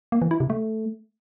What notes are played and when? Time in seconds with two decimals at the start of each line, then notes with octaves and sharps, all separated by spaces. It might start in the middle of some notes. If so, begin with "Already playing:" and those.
0.12 A#3
0.22 E3
0.31 E4
0.40 C3
0.50 A3